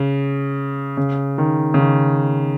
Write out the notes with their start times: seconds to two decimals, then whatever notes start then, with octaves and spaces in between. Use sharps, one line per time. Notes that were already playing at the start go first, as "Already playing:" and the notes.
Already playing: C#3
0.97 C#3
1.38 D#3
1.74 C#3
1.78 D#3